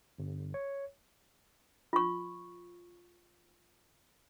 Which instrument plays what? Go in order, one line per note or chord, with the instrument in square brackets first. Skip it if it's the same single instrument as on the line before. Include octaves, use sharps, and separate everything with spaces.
[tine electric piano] G1
C#5
[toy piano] F4 C#6